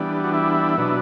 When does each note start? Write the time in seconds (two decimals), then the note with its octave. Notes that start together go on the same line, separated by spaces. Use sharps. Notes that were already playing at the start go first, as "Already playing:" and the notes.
Already playing: E3 G3 B3 D4
0.24 F#4
0.33 E4
0.77 B2 F#3 B3 D4